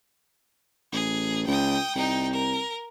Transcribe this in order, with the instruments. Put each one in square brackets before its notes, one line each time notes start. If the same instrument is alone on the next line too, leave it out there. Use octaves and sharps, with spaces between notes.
[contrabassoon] A1 [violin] G#4
[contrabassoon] C#2 [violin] G5 D#6
[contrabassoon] C2 [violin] D#4 G5
[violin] A#4